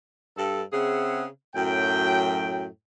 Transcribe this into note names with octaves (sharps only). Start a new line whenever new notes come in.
G2 A4
C#3 C4 G#4 E5 F#5
F#2 A2 F#3 G5